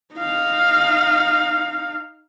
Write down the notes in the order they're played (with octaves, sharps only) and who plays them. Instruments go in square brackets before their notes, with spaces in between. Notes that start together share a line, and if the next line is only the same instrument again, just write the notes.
[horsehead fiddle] D#4 F5